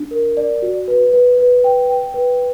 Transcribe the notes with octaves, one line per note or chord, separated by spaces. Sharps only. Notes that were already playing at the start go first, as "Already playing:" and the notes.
Already playing: D4
A#4
D5
F#4
B4
B4
B4
G5
G5
B4